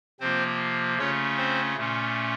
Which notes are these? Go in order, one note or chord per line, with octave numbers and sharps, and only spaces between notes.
C3 F3 A#3 C4 F4 C5
C#3 A3 C#4 F4 C#5
C4 C5
A#2 A3 C#4 F4